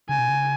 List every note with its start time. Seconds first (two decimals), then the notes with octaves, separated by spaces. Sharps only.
0.09 C#3 G#5
0.18 B2
0.29 C#3